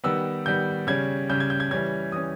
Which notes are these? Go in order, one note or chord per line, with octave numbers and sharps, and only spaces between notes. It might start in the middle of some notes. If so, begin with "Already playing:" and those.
D#3 G3 B3 E6
D#3 G3 B3 G6
C#3 G3 C#4 G#6
C#3 G3 C#4 G6
G#6
G6
G#6
E3 G3 C#4 G#6
E3 G3 C#4 D#6